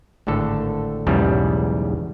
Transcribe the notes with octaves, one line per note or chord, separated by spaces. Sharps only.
G#1 A2 D3 A4
B1 E2 G#2 C#3 G3 B3